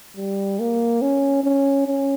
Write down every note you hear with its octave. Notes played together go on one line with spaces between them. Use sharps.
G3
A#3
C#4
C#4
C#4